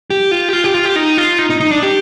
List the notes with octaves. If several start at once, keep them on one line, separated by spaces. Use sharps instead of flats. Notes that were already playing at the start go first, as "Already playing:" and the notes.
G4
F4
G4
F4
G4
F4
G4
D#4
F4
D#4
D#4
D#4
D4
G4